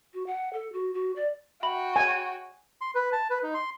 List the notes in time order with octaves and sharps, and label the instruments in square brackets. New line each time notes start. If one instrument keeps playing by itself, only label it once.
[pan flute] F#4
F#5
A4
F#4
F#4
D5
[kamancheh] F#4 G5 [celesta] E5 B5 F#7
[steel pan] G#5
[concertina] C6
B4
A5
B4
D#4
C6